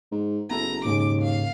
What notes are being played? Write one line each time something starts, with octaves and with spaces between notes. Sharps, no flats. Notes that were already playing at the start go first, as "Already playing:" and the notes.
G#2
F#1 B3 E4 A4 A#5
D#2 G#2 C#3 C#4 D6
F5